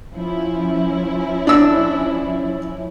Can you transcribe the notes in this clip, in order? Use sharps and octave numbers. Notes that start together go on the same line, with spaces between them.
F3 C#4 E4
D4 E6